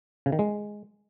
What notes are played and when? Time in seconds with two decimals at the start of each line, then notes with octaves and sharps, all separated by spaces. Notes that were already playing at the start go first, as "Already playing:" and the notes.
0.26 C#3
0.32 D#3
0.39 G#3